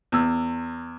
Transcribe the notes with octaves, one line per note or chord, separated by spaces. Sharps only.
E2 E6